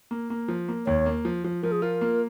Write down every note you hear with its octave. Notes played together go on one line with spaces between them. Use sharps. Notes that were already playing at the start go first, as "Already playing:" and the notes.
A#3
A#3
F3
A#3
D#2 C#5
A#3
F3
F3
F3 A#4
G#4
F4 A#4
A#3